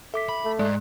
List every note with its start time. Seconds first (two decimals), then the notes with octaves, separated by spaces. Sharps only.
0.14 A4 E5 D6 B6
0.29 B5
0.45 A3
0.59 G#2 G#3 D5